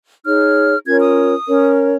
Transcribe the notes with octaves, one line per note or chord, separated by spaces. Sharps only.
D#4 G#4 C#5 F6
C#4 F4 A#4 C#5 G#6
D#6
C#4 A#4 C#5